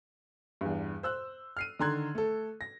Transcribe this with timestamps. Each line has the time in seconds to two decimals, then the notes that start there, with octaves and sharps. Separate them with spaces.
0.61 E2 G2
1.03 C5 E6 F#6
1.57 F6 C7 D#7
1.79 D3 D#3 A#5 C6 F#6 G#6
2.15 A3 A4
2.61 A#6